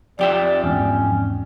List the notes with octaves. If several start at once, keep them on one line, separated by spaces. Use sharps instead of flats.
F2 G4 D5 E5
E2 G#2 C#4